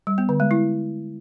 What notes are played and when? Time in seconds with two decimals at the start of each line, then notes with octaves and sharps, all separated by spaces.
0.07 G3
0.18 B3
0.29 D3
0.40 G#3
0.51 E4